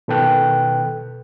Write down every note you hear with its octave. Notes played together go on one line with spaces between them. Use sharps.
B2 D#3 A4 B4 G5 F#6